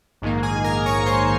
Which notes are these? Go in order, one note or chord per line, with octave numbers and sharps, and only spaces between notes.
A#1 G#2 D#3 A#3
G#4 G#5
A#4 A#5
C#5 C#6
C5 C6